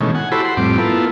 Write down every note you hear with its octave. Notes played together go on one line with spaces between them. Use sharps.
B2 D#3 E3 G#3 A3 C#4
F#5 G#5
E4 F#4 G4 A4 C5 B5
F#5 C6
F2 A2 G3 C4 D6
A#3 B3 E4 F4 A4